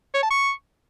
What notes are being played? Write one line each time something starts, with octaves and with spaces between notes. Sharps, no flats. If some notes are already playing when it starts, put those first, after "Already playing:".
C#5
A5
C#6